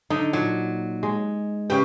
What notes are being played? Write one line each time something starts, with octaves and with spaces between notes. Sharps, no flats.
D3 D#4
A#2 F#3
G#3
C#3 G4 B4 G5